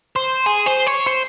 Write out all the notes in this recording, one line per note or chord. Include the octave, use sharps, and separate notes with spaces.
C5
G#4
C5
C#5
C5